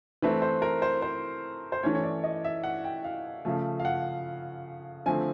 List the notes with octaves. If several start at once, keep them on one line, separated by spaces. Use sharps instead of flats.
E3 A3 C4 B4
C5
A#4
C5
C5
C5
E3 A3 C#4 C#5
C#5
D5
D#5
E5
F#5
G5
F5
C#3 F3 A3
F5
F#5
D3 F3 A3 C4 G#5